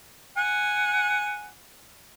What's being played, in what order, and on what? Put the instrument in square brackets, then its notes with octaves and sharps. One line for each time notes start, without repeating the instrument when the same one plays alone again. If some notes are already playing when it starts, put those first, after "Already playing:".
[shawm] F#5 [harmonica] G#5